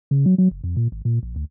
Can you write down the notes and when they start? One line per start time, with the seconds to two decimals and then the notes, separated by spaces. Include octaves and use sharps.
0.11 C#3
0.26 F#3
0.38 F#3
0.51 F#1
0.64 F2
0.77 A#2
0.92 G#1
1.05 A#2
1.23 A#1
1.36 D2